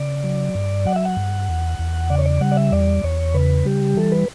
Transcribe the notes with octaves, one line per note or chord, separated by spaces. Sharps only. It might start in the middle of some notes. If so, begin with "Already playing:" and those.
Already playing: C#3 D5
F#3
G2
F#3 F#5
E5
F#5
G2
E2
E2
C#3 D5
C#5
D5
G3 F#5
D5
E5
E2 D5
E2 C#5
C#3 B4
G3 G4
E3 A4
B4